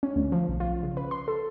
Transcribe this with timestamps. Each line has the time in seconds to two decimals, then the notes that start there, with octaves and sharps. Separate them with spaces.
0.03 C#4
0.16 D2
0.32 F3
0.49 B1
0.60 F4
0.83 C#3
0.97 B4
1.11 C6
1.28 A4